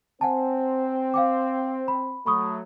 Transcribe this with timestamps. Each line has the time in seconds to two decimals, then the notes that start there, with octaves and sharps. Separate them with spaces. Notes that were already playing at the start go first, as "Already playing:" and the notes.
0.21 C4 F#5 G#5 A5
1.14 F5 G5 D6
1.88 B5
2.26 F#3 A3 B5 C#6 D#6